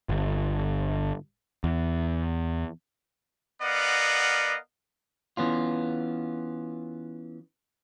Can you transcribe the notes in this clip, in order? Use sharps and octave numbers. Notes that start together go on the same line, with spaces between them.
G1
E2
B3 A#4 D5 D#5 F5 F#5
E3 B3 C#4 F4